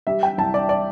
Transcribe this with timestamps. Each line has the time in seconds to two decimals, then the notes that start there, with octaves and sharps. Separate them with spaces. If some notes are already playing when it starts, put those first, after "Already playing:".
0.07 G3 E5
0.23 G5
0.38 C2 A5
0.54 D5
0.69 D5